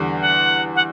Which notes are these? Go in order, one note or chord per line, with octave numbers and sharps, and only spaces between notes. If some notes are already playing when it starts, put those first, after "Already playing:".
Already playing: E2 D3 G3
F#5
F#5